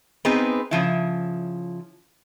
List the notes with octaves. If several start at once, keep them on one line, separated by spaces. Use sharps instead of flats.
B3 C4 D#4 G#4 B4
C#3 F3 E4